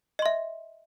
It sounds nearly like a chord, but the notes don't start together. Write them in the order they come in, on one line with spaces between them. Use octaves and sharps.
D#5 C6 E5